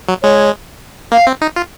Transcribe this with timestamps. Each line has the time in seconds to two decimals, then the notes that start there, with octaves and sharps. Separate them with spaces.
0.08 F#3
0.23 G#3 C#5
1.12 A#3 F5
1.27 C4
1.41 D#4
1.56 F4